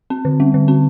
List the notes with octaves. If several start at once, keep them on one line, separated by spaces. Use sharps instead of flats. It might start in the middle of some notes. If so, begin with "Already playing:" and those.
C4
D3
G3
D3
C4